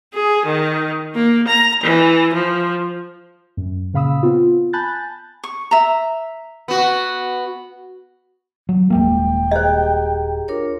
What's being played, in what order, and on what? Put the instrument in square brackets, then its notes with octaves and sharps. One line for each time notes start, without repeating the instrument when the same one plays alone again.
[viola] G#4
D#3
A#3
A#5
E3
F3
[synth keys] F#2
A#2 C#3 F5 B5 D#6 E6
B3 C4 F4
G#5 A5 B5 F#6 G6 A6
[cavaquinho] C#6
E5 A#5
[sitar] B3 F#4
[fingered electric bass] F#3
[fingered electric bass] D#1 G#3 A#3 [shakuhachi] G5
[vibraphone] G4 G#4 A#5 [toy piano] C5 D#5
[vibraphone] D4 A#4 C#5 [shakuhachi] F4